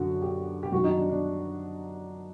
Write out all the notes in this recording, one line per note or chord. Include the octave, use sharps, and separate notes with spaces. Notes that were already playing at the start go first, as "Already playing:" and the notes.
Already playing: F#2 D3 F#3 F#4
G4
G4
F#2 D#3 G3 F#4
D#4
D4
D4